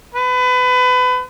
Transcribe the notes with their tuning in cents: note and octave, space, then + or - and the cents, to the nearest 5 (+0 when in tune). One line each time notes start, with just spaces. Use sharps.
B4 +25